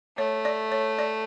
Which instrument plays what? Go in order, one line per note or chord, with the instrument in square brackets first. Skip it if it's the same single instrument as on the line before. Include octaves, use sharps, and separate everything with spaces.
[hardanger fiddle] A3 [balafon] C#5
[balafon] D5
C#5
D5